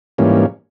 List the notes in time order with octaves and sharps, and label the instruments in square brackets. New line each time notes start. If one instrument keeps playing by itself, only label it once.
[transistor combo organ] G#2 E3 G3 A#3 C#4